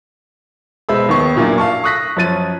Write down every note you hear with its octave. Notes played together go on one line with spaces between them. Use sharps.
B2 G#3 C5 E5 B5 E6
D#2 D#3 B3 C#6 C7
F#2 A#2 F#3 A#3 D4 E4
F5 A5 C#6
C#6 D#6 F#6 A#6 B6
F#2 F3 C#5 A6 D#7